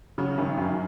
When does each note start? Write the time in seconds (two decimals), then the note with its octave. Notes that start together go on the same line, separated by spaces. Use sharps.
0.18 C#3 F#3
0.38 G#1
0.58 F#2